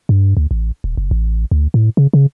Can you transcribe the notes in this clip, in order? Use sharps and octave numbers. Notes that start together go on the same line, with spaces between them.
G2
D2
A1
D#1
F#1
A1
D2
A2
C#3
C#3